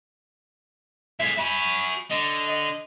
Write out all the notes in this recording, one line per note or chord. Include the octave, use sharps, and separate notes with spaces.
B1 G#3 E5
F#4 G#5 B5
D3 D#5
D#5